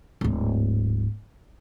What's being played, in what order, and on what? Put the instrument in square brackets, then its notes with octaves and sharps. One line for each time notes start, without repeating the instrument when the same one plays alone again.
[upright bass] D1 G#2